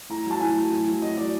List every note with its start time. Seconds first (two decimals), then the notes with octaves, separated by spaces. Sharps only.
0.09 A2 A#5
0.26 F#3 A5
0.40 A2 G#5
0.56 F#3
0.71 A2
0.87 F#3
1.02 A2 D#5
1.17 F#3 D5